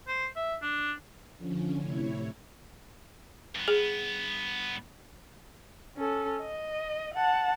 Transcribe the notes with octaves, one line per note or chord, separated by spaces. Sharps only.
C5
E5
D4
D3 F3 C#4
A2 C3 E4 C#5
G2 B3
G#4
C#4 A4
D#5
F#5 A5